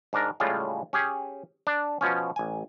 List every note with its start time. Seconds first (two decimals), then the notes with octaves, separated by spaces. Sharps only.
0.13 G#2 D4 A#4
0.40 A2 C#3 G3 G#3 F4
0.93 C#4 G4 G#4
1.67 D4
2.01 B2 F3 C#4
2.36 A1 G#5